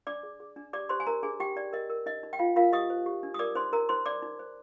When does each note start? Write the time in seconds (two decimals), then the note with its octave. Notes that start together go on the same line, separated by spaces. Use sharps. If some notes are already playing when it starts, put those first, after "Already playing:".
0.07 D4 D5 D6
0.23 G#4
0.40 G#4
0.56 D4
0.73 G4 D5 D6
0.89 G4 C5 C6
1.00 G#5
1.07 D4 A#4 A#5
1.23 D4 G#4 G#5
1.40 D#4 G4 G5
1.56 D#4 D5
1.73 A#4 D#5
1.90 A#4
2.06 D#4 D#5
2.23 D#4
2.33 G5
2.39 D#4 F4 F5
2.56 F4 A#4 F5
2.72 G4 D#5 D#6
2.90 C5
3.06 G4
3.23 D4
3.34 D#6
3.39 A#4 D5 D6
3.55 D#4 C5 C6
3.72 D#4 A#4 A#5
3.89 D#4 C5 C6
4.06 D#4 D5 D6
4.22 D#4
4.39 C5